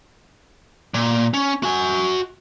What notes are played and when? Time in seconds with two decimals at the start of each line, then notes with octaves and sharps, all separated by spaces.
0.94 A#2
1.34 C#4
1.63 F#4 G#5